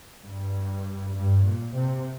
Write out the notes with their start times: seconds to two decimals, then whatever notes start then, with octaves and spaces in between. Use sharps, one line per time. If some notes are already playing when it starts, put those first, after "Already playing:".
0.21 G2
1.13 G2
1.44 A#2
1.74 C3